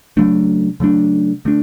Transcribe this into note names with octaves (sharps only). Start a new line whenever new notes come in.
C#3 F#3 A3 D4
C#3 F#3 A3 D4
D3 A3 D4